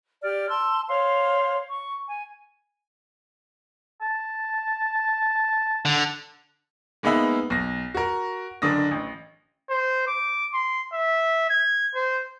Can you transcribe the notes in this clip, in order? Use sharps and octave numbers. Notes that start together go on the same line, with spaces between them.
G4 D5 F6
A5 C6 E6
C5 C#5 F5 C6
C#6
G#5
A5
D3
G#3 A#3 B3 D#4 B4 E5
B1 A#6
F#4 A#4
F#1 D3 D4 D#6 A#6
A1
C5
D6
C6
E5
G#6
C5